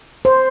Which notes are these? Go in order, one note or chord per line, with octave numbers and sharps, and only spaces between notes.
C5